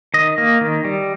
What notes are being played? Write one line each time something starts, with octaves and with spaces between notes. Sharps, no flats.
D#3 D#5
A#3
D#3
G3